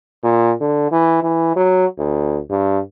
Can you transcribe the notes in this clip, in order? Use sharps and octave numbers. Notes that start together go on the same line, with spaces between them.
A#2
D3
E3
E3
F#3
D2
G2